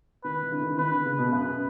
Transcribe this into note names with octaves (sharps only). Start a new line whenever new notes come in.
D#3 B4
E3
D3
D#3
E3
D#3 B4
D3
C#3
B2
F#2 B4